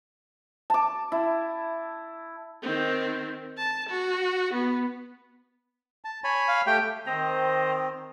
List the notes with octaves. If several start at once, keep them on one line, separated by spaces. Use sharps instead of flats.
A5 D6
E4
D#3 C4
A5
F#4
B3
A5
C#5 G#5 B5
F5
A3 G4 G5
D#3 C4 C5 D#5 A#5